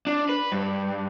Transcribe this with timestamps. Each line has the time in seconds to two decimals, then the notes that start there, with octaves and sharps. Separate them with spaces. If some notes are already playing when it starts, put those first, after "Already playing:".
0.07 D4
0.29 B4
0.52 G2